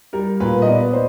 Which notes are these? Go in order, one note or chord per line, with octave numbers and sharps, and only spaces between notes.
G3 A#4
A#2 B4
D#5
B3 D5
C5